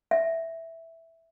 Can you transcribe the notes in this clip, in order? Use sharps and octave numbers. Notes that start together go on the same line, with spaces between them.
E5